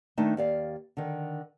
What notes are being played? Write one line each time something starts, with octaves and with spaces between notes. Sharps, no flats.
D#3 A3 D4 D#4
D#2 D5 F5
D3 D#3